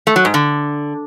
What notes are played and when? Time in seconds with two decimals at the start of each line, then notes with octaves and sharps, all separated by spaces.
0.07 A3
0.16 F#3
0.25 G#2
0.34 D3